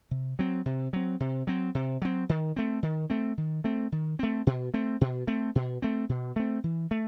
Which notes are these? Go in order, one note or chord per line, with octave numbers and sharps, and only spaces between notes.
C3
F#3 C4
C3
F#3 C4
C3
F#3 C4
C3
F#3 C4
D#3
A3 C4
D#3
A3 C4
D#3
A3 C4
D#3
A3 C4
B2
A3 C4
B2
A3 C4
B2
A3 C4
B2
A3 C4
E3
A3